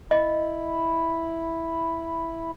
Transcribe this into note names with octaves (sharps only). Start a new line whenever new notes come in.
E4 D#5 B5